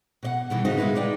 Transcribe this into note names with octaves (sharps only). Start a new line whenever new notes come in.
B2 D5 F#5
B2 D#3 E3 G3 D#4
G#2 C#3 D#4 F#4 C5
C#3 G#3 B3 E4 B4
A#2 G#3 D#4 D5 G5